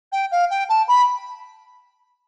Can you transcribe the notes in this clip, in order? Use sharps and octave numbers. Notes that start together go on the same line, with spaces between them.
G5
F5
G5
A5
B5